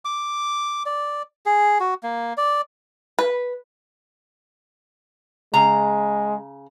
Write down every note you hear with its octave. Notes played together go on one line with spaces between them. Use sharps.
D6
D5
G#4
F#4
A#3
D5
B4
C#3 G#3 A#5